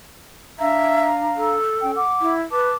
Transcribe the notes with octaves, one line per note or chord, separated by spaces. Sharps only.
D4 E5 F5 A#5
A4
C#4 G5
F#5 D6
E4
B4 A5 D6